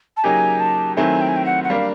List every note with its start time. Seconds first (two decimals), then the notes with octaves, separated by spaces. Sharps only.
0.17 A5
0.24 C#3 F#3 A#3 D#4 G4 G#5
0.60 A5
0.96 D#3 F#3 A3 C4 E4 G#5
1.21 G5
1.28 G#5
1.36 G5
1.46 F#5
1.64 F#5
1.70 G3 A#3 D4 F5